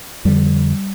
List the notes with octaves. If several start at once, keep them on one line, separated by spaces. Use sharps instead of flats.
F2 D3 G3